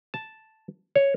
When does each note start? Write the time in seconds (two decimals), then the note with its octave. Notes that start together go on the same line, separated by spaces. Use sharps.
0.14 A5
0.96 C#5